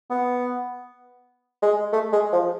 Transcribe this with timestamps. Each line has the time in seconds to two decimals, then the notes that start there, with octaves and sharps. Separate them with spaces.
0.10 B3
1.62 G#3
1.93 A3
2.12 G#3
2.32 F3